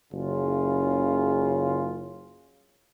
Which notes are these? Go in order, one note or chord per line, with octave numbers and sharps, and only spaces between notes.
F#1 C#3 F4